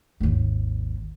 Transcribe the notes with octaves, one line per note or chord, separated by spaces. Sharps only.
G#1 D#2